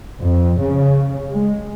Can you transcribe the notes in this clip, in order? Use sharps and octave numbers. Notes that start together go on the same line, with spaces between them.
F2
C#3
G#3